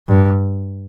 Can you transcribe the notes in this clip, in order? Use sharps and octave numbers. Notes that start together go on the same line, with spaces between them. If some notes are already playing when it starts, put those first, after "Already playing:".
G2